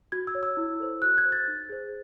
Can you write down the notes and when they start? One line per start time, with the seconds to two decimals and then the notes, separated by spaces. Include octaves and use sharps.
0.12 F#4 G#6
0.27 E6
0.35 C#5
0.43 E6
0.57 E4
0.80 A4 C5
1.02 F#4 F#6
1.18 G#6
1.25 C5
1.32 A6
1.48 D#4
1.69 G#4 C5